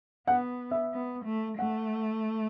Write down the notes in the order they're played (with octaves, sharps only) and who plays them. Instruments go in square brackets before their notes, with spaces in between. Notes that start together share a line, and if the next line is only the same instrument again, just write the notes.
[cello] B3 [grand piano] F#5
[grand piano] E5
[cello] B3
A3
[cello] A3 [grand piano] F#5